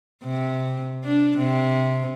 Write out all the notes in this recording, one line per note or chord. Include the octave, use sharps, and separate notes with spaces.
C3
D4
C3